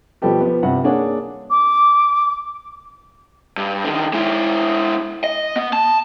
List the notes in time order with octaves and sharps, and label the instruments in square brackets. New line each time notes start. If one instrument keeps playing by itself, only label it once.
[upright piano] B2 F3 G3 B3 G4 A4
F3 B3
G2 C3 F#5
A#3 D4 G#4 C#5 F#5
[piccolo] D6
[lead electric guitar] G2
D3 D#3
G#3 E4
D#5
B3
A5